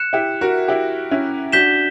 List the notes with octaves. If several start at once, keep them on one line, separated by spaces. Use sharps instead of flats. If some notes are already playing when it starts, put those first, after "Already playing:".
Already playing: F#6 C#7 E7
E4 G4
F#4 A#4
E4 G4
C#4 E4
D4 F#4 G6 B6 E7 G7